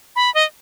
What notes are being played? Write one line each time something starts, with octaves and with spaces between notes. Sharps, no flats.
B5
D#5